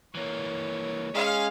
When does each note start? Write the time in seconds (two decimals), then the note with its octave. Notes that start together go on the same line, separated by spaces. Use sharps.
0.15 E3 A#3 C#5
1.14 G#3 C#4 F5